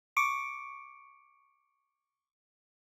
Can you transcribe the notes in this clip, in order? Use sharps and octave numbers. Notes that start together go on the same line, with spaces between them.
C#6 D6 C#7 D7